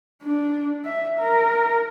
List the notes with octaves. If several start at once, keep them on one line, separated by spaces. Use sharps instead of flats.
D4
E5
A#4